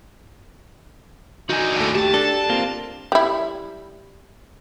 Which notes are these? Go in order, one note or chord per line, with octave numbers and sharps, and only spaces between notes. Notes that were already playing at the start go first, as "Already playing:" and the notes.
D3 D#4 F#4 G#5
D#2 A2 D3 A3
G4 A5
D4 A4
A#3 C4 F4
G3 E4